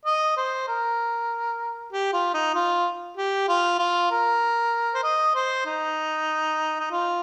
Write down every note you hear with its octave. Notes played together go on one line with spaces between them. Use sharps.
D#5
C5
A#4
G4
F4
D#4
F4
G4
F4
F4
A#4
C5
D#5
C5
D#4
D#4
F4